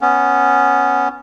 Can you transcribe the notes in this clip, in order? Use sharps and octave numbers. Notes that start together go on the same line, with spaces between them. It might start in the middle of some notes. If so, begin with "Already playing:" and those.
B3 C#4